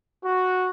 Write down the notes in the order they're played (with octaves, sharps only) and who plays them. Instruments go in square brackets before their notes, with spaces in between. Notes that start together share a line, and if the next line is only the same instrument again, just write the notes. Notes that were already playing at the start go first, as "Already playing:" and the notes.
[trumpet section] F#4